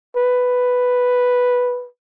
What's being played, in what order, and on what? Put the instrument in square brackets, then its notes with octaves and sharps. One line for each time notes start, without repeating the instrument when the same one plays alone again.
[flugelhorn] B4